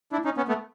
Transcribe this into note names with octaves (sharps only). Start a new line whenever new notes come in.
D4 E4
C#4 D#4
B3 C#4
A3 B3